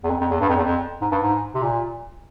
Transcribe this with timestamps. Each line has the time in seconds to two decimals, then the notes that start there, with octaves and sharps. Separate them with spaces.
0.04 E2
0.10 F2
0.20 F2
0.31 E2
0.40 G2
0.49 F2
0.56 E2
0.64 F2
1.02 G#2
1.12 G2
1.22 G#2
1.54 C3
1.62 A#2